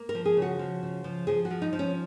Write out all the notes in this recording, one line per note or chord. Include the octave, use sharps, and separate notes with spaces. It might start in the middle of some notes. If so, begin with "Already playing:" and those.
Already playing: A#3
A#4
F3
G#4
C#3 F#4
F3
C#3
F3
F3 G#4
F#4
F3
D#4
F3
C#4